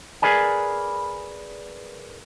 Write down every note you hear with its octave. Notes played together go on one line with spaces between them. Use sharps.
G#4 A#4 B4 D5 G#5